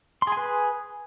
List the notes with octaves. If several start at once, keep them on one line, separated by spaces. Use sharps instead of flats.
G#4 B4 G#5 C6